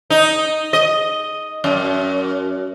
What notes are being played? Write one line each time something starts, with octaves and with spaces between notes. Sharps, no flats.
D#4
D#5
F#2